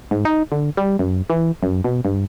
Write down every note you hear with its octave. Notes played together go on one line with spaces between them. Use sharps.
G#2
D#4
D3
G3
F#2
E3
F#2
B2
G2